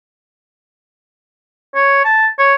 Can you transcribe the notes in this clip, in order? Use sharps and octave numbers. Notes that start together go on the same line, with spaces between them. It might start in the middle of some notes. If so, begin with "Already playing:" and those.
C#5
A5
C#5